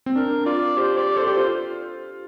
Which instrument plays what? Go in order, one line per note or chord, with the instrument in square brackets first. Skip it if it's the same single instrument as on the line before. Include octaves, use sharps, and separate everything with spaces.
[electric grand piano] C4
[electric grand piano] D4 [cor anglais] A#4
[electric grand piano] F4 [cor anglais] D5
[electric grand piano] G4 [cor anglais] C5
[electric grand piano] G4 [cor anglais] D5
[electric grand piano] A4 [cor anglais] C5
[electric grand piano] G4
[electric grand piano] F4 [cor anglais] C5